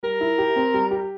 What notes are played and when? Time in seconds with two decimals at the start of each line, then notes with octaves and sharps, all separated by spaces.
0.03 G3 A#4
0.21 E4
0.38 G4
0.56 C4
0.74 G3
0.91 G4